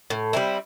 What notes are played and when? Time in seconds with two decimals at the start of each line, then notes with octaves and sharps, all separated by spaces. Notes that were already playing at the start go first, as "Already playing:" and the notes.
0.10 A2
0.33 G3 C4 E4